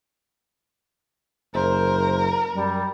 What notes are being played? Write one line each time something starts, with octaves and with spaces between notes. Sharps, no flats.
F#1 A#4 C5
F#2 G3